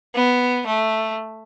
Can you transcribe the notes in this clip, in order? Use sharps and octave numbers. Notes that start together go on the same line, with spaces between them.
B3
A3